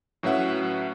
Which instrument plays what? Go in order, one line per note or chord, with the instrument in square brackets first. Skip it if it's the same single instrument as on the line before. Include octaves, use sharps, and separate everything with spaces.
[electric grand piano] A2 F#3 C#4 B4 E5 F#5